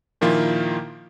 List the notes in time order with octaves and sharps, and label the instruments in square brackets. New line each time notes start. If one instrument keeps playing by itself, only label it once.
[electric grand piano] A#2 D#3 F3 A#3 E4 F4